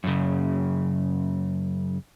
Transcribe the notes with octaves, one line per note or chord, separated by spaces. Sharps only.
F#2 C#3